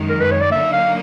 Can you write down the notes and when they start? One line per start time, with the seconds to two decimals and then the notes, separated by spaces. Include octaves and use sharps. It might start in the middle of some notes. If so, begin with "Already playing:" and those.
Already playing: F#2 D#3 G#3
0.09 A#4
0.21 B4
0.31 C#5
0.41 D5
0.52 D3 F#3 A#3 D#4 E5
0.73 F5